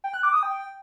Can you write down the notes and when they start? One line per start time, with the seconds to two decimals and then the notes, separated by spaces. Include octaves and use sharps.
0.04 G5
0.14 F#6
0.23 D6
0.33 D#6
0.43 G5